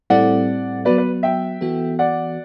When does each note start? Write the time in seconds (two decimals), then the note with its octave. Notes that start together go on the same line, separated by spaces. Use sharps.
0.10 A2 G3 C4 E4 A4 D5 F#5
0.85 F#3 B3 F#4 B4 D5
0.98 B4
1.23 E5 G5
1.61 E3 B3 F#4 A4
1.99 D5 F#5